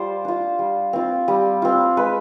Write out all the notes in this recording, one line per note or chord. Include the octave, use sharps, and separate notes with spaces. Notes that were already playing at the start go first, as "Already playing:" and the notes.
Already playing: G3 F4 C5 D5
D4 F4
G3
C4 F4
G3
C4 F4
G#3 B4